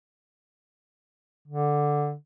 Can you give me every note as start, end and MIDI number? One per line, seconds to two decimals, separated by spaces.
1.48 2.14 50